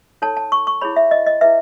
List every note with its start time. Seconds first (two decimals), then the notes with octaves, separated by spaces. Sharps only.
0.22 D#4 A4 C#5 A5
0.37 A5
0.52 C#6
0.67 C#6
0.81 E4 G#4 C#5 B5
0.96 E5
1.11 D#5
1.27 D#5
1.41 E4 G#4 B4 E5